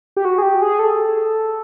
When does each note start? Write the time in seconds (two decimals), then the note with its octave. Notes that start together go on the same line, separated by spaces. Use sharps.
0.17 G4
0.25 F#4
0.38 G#4
0.42 G4
0.62 G#4
0.79 A4